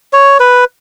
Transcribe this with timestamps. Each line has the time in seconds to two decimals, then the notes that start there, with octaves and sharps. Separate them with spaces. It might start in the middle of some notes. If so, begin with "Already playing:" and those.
0.13 C#5
0.40 B4